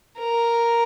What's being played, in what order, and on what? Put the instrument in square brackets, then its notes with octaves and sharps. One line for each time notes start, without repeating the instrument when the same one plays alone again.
[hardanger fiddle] A#4